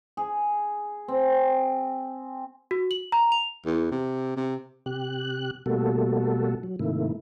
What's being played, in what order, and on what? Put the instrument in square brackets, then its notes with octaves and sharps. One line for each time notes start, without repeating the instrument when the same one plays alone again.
[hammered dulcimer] G#4
C4
[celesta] F#4
F#7
A#5
F7
[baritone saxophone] E2
C3
C3
[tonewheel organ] C3 G4 F#6
B2 G3 A3 A#3 F#4 A4
F#3
G#2 C3 D#3 A3 A#3 E4